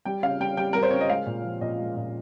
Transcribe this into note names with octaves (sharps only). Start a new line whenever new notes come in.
G3 G5
C#3 F5
G3 G5
G3 G5
G3 A#4
C5
C#3 C#5
D#5
G#3 F5
A#2
F3
A#2 D#5
G#3
A#2